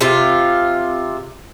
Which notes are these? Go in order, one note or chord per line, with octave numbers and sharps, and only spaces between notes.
C3 F4